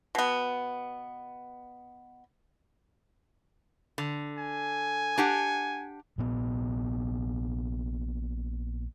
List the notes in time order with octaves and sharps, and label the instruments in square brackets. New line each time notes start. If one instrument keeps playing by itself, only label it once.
[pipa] B2 B3
[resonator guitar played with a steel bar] D3
[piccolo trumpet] G#5
[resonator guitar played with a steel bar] D4 G4 F#5
[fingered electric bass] A#1 A#2 B3